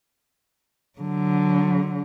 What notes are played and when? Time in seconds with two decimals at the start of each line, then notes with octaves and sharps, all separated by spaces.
0.99 D3 F#3